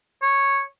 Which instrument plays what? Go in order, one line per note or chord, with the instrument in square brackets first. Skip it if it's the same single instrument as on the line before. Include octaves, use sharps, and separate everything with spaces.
[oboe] C#5